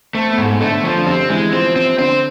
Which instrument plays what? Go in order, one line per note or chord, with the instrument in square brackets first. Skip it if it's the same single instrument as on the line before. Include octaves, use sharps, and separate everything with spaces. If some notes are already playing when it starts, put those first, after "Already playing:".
[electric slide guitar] A3 [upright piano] C4
[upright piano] B3
[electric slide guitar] G#2
[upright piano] A3
[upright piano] D3 [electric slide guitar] A3
[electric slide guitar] F3
[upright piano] D3
[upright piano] C3 [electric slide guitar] C4
[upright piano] D3
[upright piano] E3 [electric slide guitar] G#3
[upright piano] F3 [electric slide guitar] C4
[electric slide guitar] C4
[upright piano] D3 [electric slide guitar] C4